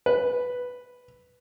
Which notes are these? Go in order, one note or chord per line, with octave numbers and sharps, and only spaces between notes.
B4